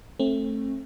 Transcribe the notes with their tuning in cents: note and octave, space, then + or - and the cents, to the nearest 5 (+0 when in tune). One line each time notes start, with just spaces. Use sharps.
A3 +0 C4 +35